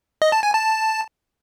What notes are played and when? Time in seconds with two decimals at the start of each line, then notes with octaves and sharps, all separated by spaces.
0.22 D#5
0.32 A5
0.43 G#5
0.54 A5